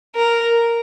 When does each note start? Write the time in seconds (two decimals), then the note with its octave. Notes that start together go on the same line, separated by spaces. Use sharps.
0.16 A#4